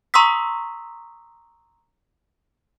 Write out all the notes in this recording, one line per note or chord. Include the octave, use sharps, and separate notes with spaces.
A#5 C6 C#6 D#6 E6 B6